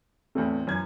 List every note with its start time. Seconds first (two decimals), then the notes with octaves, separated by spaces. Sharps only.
0.35 E2 A2 A3 C4
0.67 F#2 E3 G#6